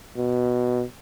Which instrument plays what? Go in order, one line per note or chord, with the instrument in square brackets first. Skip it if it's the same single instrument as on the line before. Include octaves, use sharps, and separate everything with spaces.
[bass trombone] B2